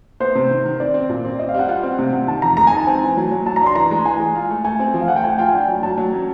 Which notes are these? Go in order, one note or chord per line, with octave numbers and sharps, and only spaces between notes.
B3 C5
C3
D#3
D#3
C4 D5
C4
A#2
C4
C4 D#5
F5
G3 F#5
F4 F#5
C4
C3
C3
D#3 A5
F2 A#5
G#3 A#5
G#5
D#4 A5
C4 G#5
E3
F#3
F#3
F#3 A5
A#5
D4
C6
E3 A#5
G#3
E3 G#5
G#3
F4
A3
A3 G#5
C4
F3
F5
A3 F#5
G5
A3 G#5
F4 G5
G#5
D4 G5
F#3
F#3 A5
F#3
C#4